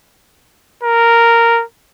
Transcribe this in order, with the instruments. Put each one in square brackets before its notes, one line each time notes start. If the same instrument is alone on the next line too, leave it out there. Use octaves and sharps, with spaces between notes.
[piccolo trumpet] A#4